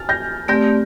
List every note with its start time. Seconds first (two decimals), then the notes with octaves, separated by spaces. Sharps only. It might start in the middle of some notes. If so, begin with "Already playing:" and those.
Already playing: F6 A6
0.09 G6 A#6
0.48 A3 C4 G4 D5 G6 A#6